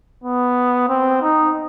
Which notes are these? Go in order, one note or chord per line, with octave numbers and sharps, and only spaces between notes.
B3
C4
D#4